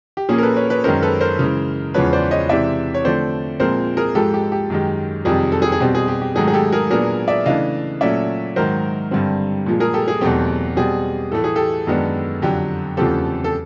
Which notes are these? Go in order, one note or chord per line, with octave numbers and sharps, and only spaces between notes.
G4
A#2 F3 A#3 C#4 G#4
A#4
A4 B4
B4 C#5
B4 C#5
F#2 D#3 G#3 C#4 A#4 C5
A4 B4
A#4 C5
C#3 E3 G#3
E2 C#3 F3 G#3 B4 C#5
C5 D5
C#5 D#5
C3 E3 G#3 C4 D5 E5
C#5
D3 F3 A3 C4 C5 D5
A#2 F3 G#3 C4 A#4 C5
G#4 A#4
G#2 F3 G#3 G4 A4
G4
G4
F#2 D#3 G#3 G4
F2 C3 D#3 G3 G#4
A4
G#4
G#4
B2 G3 C4 G4
G#4
G4
G4
G#2 D#3 F#3 A3 G#4
G#4
G4 A4
G#4 A#4
A#2 F#3 B3 D4 G#4 A#4
D5 E5
C#3 E3 A3 D4 D#5 F5
A#2 F#3 A3 C#4 D5 E5
G#2 D#3 F#3 A#4 C5
G2 D3 G3 C4
A#2 F3 G#3
G#4 A#4
G4 A4
G#4
E2 B2 F#3 A3 C4 G4
B2 G3 C4 G#4
A2 E3 A3 A4
G#4
G4 A4
F#2 D#3 G#3 B3 D4
F2 D3 F#3 G4
E2 C#3 F3 A3 C4 G4 A4
A4